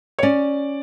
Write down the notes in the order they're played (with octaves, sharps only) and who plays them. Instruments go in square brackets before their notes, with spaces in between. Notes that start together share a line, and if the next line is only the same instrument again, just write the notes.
[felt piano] C#5
[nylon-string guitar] C#4 [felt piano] D5